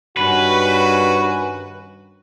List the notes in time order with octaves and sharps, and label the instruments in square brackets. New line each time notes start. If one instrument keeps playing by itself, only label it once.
[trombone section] G2 [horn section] D#3 C#4 F#4 [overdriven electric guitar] B4